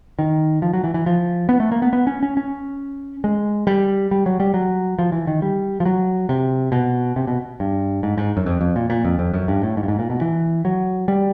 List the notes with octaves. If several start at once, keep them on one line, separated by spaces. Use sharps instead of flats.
D#3
F3
F#3
E3
E3
F3
B3
A3
A#3
B3
B3
C#4
C#4
C#4
G#3
G3
G3
F#3
G3
F#3
F3
E3
D#3
G3
F3
F#3
C3
B2
C3
B2
G2
G#2
G#2
F#2
F2
F2
A#2
A#2
F2
F2
F#2
G2
A2
G#2
G2
G#2
A#2
B2
E3
F#3
G3